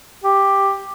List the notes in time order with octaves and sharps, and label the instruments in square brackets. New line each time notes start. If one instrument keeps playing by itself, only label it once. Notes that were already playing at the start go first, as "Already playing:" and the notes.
[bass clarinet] G4